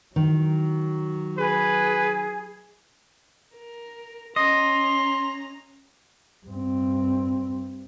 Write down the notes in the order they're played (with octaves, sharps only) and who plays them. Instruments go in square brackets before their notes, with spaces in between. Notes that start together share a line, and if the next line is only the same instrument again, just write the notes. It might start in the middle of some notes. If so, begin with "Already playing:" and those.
[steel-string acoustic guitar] D#3 [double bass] F#3
[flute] G#4 [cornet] B4
[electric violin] A#4
[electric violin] C#4 A#5 [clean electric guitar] D#5 [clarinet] C6
[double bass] G2 C4